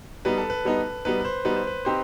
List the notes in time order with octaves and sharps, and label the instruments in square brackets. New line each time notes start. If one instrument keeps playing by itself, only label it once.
[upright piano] G3 B3 D#4 [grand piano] B4
[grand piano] A4
B4
[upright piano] G3 B3 D#4
[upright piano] G3 B3 D#4 [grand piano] B4
[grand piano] B4
C5
[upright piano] G3 B3 D#4 [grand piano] B4
[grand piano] C5
B4
[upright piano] C4 D#4 G4 C5